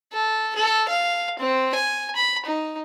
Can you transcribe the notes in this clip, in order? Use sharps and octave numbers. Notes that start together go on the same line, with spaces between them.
A4
A4
F5
C4
G#5
B5
D#4